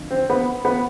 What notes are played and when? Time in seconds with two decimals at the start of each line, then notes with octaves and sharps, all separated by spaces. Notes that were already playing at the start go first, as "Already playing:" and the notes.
Already playing: F2 D3
0.11 C4
0.30 B3
0.65 B3